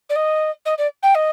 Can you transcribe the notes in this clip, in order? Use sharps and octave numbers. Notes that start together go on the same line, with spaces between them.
D5
D#5
D#5
D5
G5
D#5